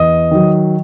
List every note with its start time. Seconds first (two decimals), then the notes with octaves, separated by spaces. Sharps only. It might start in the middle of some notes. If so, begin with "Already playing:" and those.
Already playing: E2 D#5 D#6
0.31 D#3 F#3